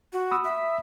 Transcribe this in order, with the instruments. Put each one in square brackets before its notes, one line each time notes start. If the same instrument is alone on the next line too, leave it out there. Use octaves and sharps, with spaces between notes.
[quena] F#4
[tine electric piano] B5 D#6 E6
[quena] E5